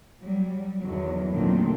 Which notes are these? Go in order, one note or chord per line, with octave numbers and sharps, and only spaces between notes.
F#3 G3
E2 D3 D#3 F#3
A#2 D3 D#3 F#3 A3 C4